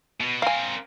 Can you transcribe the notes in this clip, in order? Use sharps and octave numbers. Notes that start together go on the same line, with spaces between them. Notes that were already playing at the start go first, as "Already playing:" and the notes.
B2
C4 A#4 F5 G#5